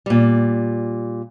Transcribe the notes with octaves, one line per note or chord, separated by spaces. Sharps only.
A#2 G3